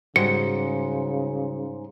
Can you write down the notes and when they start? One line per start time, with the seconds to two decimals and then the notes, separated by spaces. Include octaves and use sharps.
0.16 G#2 C#3 G3 F#4 C#7